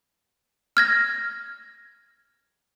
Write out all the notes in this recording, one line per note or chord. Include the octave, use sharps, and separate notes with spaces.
F6 G#6 A#6